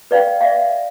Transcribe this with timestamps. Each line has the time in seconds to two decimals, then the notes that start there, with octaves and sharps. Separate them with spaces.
0.11 B4 D5 F5 G5
0.41 D5 E5 F5